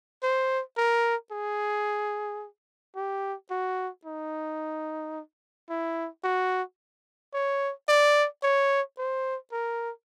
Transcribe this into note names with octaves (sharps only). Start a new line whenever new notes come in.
C5
A#4
G#4
G4
F#4
D#4
E4
F#4
C#5
D5
C#5
C5
A#4